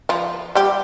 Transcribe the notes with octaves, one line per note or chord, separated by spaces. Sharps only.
F3 F4
G3 G4